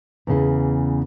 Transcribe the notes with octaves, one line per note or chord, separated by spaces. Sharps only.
E2 C#3 E3